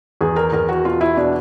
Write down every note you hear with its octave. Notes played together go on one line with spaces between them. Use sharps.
E2 G#4
A#4
E2 A#4
F#4
B2 F4
E4
B2 D4